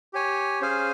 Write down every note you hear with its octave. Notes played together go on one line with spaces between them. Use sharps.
G4 C#5 G#5
C#4 G#4 C5 F5 G#5